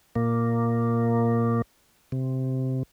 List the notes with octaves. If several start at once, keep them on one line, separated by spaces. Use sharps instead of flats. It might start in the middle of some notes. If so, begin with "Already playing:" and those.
A#2 A#3
C3